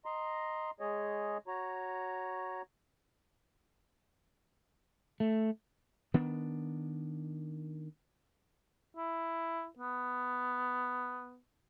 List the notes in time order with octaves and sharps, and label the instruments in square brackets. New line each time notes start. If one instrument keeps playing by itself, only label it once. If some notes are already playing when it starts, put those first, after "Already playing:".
[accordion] D#5 A#5 C6
G#3 G#4 C#5 D#5
F#4 C#5 A#5
[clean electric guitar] A3
[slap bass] D#3 B3 D4
[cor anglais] E4
B3